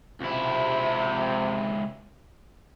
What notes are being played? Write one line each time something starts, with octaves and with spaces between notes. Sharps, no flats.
C#2 C3 E4